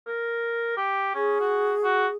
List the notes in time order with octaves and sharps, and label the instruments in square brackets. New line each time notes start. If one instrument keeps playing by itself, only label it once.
[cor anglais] A#4
G4
[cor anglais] C#4 [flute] G#4
[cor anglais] F#4
F#4